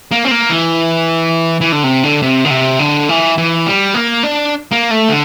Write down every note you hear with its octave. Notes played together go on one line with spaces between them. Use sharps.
A#3
C4
A#3
E3
E3
D3
C3
D3
C3
D3
C3
D3
E3
E3
G3
A#3
D4
A#3
A3
D3